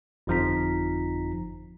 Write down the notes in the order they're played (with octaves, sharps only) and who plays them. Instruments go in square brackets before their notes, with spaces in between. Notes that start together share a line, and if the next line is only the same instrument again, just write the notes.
[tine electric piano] G1 F2 F3 D#4 A#5 B6